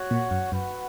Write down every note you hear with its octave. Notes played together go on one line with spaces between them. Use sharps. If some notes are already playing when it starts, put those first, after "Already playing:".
Already playing: F#4 C#5 F#5
A#2
F#2
F#2 F#4 B4 F#5